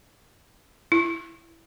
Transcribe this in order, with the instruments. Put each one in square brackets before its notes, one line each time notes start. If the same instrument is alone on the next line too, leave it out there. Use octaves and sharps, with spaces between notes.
[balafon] E4